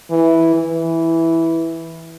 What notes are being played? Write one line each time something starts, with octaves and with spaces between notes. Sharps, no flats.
E3
E3